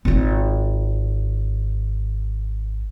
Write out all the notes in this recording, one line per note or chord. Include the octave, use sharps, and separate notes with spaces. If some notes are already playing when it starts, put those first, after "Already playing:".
G#1 F4